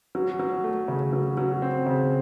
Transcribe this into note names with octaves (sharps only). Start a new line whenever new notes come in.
F#3
F#3
A3
C#3
F#3
F#3
C4
C#3